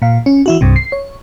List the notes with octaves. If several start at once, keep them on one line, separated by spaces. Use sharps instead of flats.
A#2 F5
C#4
E3 E4 F#4
C2 G2 C3
C7
C#5